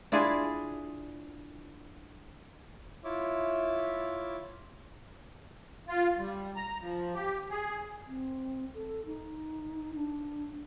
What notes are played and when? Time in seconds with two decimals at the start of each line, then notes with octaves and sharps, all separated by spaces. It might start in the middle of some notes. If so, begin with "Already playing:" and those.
0.12 D4 E4 F4 G#4
3.04 E4 F4 C#5 E5 D6
5.88 F4
6.18 G3
6.56 A#5
6.80 F3
7.14 G4
7.50 G#4
8.07 C4
8.74 A4
9.06 D#4
9.95 D4